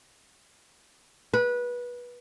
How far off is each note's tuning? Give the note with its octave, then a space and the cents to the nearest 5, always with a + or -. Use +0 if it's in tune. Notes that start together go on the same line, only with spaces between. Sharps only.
B4 -20